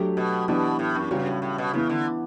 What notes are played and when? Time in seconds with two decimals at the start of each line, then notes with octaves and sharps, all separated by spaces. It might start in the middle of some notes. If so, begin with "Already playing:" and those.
Already playing: F#3 A3 D4 G4
0.17 B2
0.48 B2 E3 B3 D4 G4
0.79 A2
0.95 F#2
1.11 G2 C#3 G3 C#4 F#4
1.26 A2
1.42 A2
1.58 B2
1.74 C#3 E3 B3 E4
1.90 D3